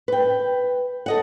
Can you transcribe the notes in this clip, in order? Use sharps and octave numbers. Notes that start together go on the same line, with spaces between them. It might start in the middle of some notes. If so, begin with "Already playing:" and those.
B4 G5
A4 D#5 F#5